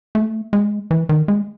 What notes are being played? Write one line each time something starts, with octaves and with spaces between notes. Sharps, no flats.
A3
G#3
E3
D#3
G#3